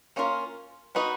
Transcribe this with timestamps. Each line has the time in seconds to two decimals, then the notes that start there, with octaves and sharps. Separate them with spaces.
0.16 A#3 C#4 F4 A#4
0.95 B3 D#4 F#4 B4 D#5